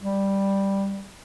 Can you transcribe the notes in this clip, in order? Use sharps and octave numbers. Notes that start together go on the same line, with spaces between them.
G3